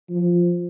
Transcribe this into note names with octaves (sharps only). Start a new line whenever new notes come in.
F3